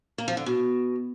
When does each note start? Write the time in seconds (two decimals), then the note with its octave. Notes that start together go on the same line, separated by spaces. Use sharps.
0.18 A#3
0.28 F3
0.37 D3
0.46 B2